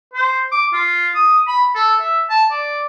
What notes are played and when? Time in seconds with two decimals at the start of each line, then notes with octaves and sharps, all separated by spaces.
0.14 C5
0.52 D6
0.73 F4
1.15 D#6
1.48 B5
1.75 A4
2.00 E5
2.30 A5
2.51 D5